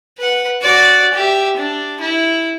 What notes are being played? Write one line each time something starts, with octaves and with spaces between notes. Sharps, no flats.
B4 F#5
F#4 D5
G4 E5
D4
E4